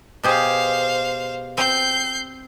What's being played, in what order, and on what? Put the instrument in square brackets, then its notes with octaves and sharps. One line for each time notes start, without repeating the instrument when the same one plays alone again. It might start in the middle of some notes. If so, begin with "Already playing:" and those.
[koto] B2 G4 G#4 [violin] C5 F5
[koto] C4 [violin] G6 C7